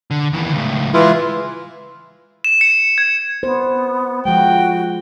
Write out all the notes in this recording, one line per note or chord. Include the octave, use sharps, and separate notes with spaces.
D3
D#2 E3
C#2 A2
E3 G#3 E4 F4
E7
C#7
G#6
B3 C5
F3 G#3 F#4 G5